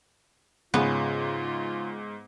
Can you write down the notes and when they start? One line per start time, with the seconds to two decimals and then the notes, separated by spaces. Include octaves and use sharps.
0.74 G#2 C#3 B3 F4